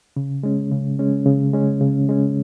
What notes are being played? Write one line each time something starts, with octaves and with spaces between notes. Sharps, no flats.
C#3
G#3 C#4
C#3
G#3 C#4
C#3
G#3 C#4
C#3
G#3 C#4